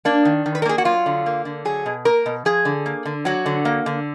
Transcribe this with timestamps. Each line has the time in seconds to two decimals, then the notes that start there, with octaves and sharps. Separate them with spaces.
0.05 A#3 D4
0.25 D#3
0.46 D#3
0.55 B4
0.62 A#4
0.65 A#3 G#4
0.78 F#4
0.85 F#3 F4
1.06 D3
1.26 A#3
1.45 D3
1.65 F#3 G#4
1.86 B2
2.05 A#3 A#4
2.26 B2
2.45 F3 G#4
2.65 D3
2.86 A#3
3.05 D3
3.25 F#3 F#4
3.46 D3
3.65 A#3
3.86 D3